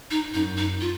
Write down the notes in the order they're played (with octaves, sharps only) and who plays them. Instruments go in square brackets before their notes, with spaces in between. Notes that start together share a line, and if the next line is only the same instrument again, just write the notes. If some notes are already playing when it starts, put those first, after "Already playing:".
[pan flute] D#4
[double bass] F#2 [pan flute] D#4
[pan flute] D#4
F4